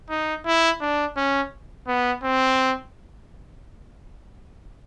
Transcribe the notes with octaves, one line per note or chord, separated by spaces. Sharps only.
D#4
E4
D4
C#4
B3
C4